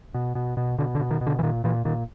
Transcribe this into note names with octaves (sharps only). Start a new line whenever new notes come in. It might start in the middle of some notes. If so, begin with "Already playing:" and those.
B2
B2
B2
B2 D3
D3
B2
D#3
B2
D3
E3
A#2 D#3
A#2 E3
A#2 D#3